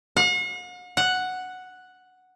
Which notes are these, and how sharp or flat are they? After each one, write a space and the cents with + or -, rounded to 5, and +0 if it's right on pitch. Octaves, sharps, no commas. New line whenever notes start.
F#5 -45
F#5 +0